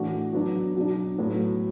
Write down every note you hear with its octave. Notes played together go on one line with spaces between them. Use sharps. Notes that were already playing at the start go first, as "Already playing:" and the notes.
Already playing: A2 E3 D4 F#4
F#3 B3 D4
B2 F#3 D4
A2 F#3 B3